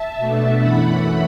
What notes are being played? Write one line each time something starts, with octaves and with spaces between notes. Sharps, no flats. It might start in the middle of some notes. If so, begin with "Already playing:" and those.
Already playing: E5 A5
B2 A3 D4
F#2 E3 A3 F#5 B5